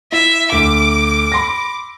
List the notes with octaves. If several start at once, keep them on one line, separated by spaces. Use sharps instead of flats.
E4 E5
D2 D6
B5 C6 A#6